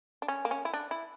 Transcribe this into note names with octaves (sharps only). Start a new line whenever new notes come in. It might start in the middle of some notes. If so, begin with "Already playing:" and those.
D4
C#4
A#3
C#4
E4
D4
E4